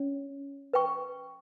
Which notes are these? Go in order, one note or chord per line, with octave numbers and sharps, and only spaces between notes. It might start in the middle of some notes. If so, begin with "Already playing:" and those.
Already playing: C#4 C#5
B4 G5 C#6